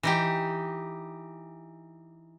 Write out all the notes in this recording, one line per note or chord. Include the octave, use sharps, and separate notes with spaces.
E3 D#4 G4